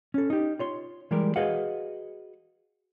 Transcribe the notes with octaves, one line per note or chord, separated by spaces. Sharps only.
C#4 A4
D#4 G4
F4 C#5 C6
E3 G3 G#3 G4 A#4
F#4 G#4 B4 D#5 F5 F#5